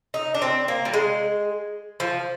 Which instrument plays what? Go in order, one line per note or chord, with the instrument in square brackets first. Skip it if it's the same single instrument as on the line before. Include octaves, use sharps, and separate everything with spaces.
[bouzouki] D#4
D4
C4
A#3
G3
G#3
F3